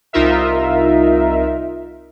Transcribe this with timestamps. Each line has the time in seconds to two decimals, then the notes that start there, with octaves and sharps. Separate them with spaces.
0.13 C2 D#4 F4 A#4 E5